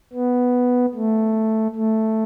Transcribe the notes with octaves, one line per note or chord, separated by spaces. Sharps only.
B3
A3
A3